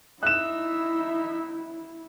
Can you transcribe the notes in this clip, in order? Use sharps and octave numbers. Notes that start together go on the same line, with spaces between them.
D#4 E4 E5 F#6 E7